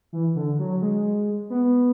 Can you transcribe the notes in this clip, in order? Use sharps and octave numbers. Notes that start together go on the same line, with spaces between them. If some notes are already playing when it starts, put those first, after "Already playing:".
E3
D3
F#3
G#3
B3